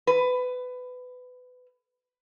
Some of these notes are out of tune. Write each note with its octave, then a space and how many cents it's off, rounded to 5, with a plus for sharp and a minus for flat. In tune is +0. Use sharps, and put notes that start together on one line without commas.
B4 +20